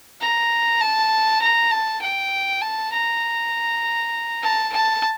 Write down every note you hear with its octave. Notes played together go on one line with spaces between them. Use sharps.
A#5
A5
A#5
A5
G5
A5
A#5
A5
A5